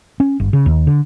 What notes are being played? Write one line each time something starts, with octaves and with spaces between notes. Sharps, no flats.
C#4
G1
C#3
D#2
D3